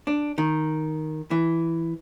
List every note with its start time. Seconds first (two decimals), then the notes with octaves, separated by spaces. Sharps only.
0.07 D4
0.38 D#3
1.31 E3